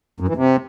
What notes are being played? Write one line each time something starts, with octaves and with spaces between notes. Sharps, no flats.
F#2
E3
C3